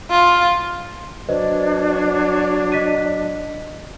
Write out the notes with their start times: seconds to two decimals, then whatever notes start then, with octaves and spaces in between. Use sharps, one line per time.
0.10 F4
1.29 F#3 D4 B4 C5 D5 D#5
2.72 D#5 B6 D#7